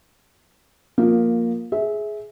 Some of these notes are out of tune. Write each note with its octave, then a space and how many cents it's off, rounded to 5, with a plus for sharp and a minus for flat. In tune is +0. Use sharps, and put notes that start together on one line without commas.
F3 +15 A#3 +0
G#4 +15 E5 -15